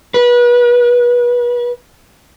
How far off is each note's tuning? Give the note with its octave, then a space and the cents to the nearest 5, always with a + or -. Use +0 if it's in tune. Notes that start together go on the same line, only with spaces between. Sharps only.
B4 -30